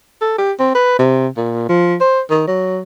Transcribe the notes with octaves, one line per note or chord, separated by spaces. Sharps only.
A4
G4
C4
B4
C3
A#2
F3
C5
D#3
F#3